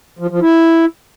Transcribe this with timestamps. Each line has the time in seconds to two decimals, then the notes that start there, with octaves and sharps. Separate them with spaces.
0.19 F3
0.30 F3
0.41 E4